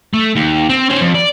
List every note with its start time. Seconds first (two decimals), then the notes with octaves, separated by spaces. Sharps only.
0.14 A3
0.36 D#2
0.69 C4
0.90 C#4 C5
1.01 F2
1.15 D5